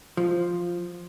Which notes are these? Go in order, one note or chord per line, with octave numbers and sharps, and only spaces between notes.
F3